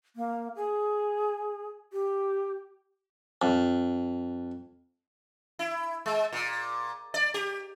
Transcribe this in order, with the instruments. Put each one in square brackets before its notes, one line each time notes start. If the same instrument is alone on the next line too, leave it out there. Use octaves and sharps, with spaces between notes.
[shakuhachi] A#3
G#4
G4
[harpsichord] F2
[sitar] E4
G#3
A#2
D5
G4